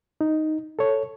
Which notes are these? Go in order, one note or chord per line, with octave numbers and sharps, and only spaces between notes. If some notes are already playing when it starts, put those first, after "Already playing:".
D#4
A4 C#5